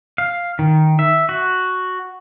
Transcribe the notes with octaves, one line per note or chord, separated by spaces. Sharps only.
F5
D#3
E5
F#4